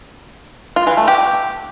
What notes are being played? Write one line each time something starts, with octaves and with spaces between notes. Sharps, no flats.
F4
E3
A3
G4